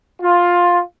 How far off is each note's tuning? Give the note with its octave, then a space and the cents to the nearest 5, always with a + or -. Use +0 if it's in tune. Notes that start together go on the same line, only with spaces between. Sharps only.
F4 +10